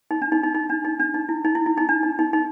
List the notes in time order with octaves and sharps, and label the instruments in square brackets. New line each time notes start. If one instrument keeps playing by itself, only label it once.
[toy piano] D#4
D4
D#4
D#4
D#4
D4
D#4
D4
D#4
E4
D#4
E4
E4
D#4
D4
D#4
D#4
D#4